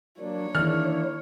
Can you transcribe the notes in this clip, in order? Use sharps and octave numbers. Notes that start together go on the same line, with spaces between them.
F#3 A#3 D4 C#5
D#3 E3 A#3 D4 E4 F6